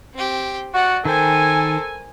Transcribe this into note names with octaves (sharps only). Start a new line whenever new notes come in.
C4 G4
F#4 D5 F#5
D#3 A4 A#4 C5 G5 G#5